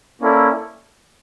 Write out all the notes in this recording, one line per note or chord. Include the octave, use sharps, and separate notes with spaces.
A#3 C#4 E4 A4 D5